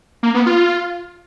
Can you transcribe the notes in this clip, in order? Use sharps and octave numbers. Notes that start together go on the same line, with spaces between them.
A#3
B3
F4